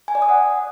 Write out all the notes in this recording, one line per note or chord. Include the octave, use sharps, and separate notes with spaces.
G#5
D5
D#6
F#5